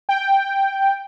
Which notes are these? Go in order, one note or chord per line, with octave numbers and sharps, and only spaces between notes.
G5